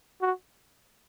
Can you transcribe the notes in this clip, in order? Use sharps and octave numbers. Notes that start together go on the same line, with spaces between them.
F#4